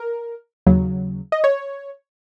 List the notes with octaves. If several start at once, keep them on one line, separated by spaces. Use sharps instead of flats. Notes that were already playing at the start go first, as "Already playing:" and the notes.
Already playing: A#4
D#2 C#3 F#3
D#5
C#5